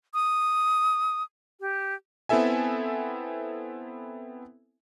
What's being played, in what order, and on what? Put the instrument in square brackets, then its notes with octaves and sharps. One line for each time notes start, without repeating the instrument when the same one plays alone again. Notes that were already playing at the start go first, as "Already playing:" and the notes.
[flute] D#6
G4
[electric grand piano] B3 C4 E4 A4 E5 G#5